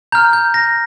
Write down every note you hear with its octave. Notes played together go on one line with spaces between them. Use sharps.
A#5 F6 G6
G6
A#6